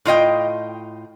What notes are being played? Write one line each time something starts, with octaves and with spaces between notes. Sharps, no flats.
A2 F4 D#5 G5